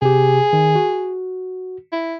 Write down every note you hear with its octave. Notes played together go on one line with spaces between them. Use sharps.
C3 G4 G#4
D#3
F#4
E4